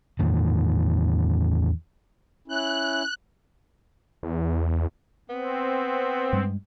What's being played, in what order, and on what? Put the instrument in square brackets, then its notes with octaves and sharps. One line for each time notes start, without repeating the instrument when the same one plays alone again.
[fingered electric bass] E2 A2 D#3
[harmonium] C#4 E4 [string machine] F#6
[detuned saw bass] E2
[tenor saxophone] B3 [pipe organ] C4
[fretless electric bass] G2 G3 G#3